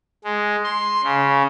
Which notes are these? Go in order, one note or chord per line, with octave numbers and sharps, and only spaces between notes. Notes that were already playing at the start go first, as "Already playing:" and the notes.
G#3
C6
C#3